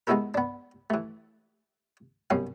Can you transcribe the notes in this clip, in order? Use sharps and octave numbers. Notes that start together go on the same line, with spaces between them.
G#3 B3 D#4 E4 A4 A#4
B3 D4
E3 A3
C2 F#2 B2 C#4 F5